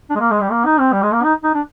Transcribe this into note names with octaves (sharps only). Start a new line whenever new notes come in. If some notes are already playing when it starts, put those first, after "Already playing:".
D4
G#3
A#3
G#3
G3
A#3
D#4
C4
G3
G#3
A#3
D#4
D#4
D4